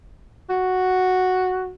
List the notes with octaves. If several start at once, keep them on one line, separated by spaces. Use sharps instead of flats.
F#4